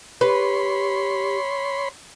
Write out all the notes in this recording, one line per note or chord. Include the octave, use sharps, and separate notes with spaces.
G4 B4 C#5 B5 C6